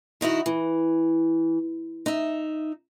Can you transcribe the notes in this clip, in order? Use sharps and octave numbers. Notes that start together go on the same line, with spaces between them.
D#3 D#4 E4 F#4
E3
D#4 E5